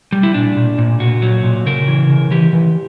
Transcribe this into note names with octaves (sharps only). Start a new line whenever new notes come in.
G3
E4
A#2 D4
A#2
A#2
A#2 F#4
F#3
A#2
C#3 A#4
E3
C#3
E3 G4
E3